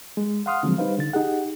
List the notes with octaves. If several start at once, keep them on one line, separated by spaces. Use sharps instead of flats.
G#3
F5 F#5 C6 D#6 F6
D3 F3 F#3 G#3 C4
G3 D#4 B4 C5 F5
D3 A6
D#4 G4 G#4 F#5